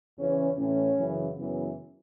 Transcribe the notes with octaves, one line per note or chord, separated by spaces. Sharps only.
E2 C#3 E3 C#4
A2 E3 C#4
F#2 C#3 E3
F#2 C#3 E3 B3